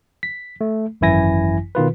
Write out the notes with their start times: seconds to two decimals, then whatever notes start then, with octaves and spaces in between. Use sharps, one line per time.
0.23 B6
0.61 A3
1.01 G#1 F#2 E3 E4 G#5 A#6
1.75 B2 D#3 F4 B4